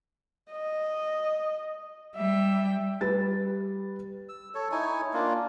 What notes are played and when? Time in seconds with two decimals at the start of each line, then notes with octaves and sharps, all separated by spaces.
0.51 D#5
2.16 G3 E5 G5
3.01 G3 B4 A6
4.29 E6
4.55 A4 C#5
4.71 D#4 E4 C#5 G#5
5.13 A#3 D4 F4